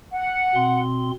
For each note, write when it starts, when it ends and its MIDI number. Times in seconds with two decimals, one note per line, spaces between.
0.12 0.79 78
0.55 1.11 47
0.55 1.11 60
0.55 1.11 84